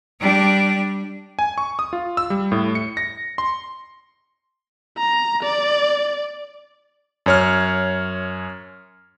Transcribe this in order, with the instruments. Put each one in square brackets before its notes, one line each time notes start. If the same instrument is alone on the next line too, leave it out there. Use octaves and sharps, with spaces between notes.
[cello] G3 D4
[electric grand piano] G#5
C#6
D#6
F4
E6
G3
A2
C#7
A#6
C6
[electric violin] A#5
D5
[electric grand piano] F#2 C#5 F6